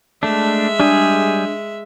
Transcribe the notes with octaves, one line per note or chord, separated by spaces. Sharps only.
G#3 A3 D4 E5
G3 D4 G#4